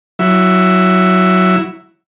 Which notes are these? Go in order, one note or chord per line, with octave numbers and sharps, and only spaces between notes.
F#3 E4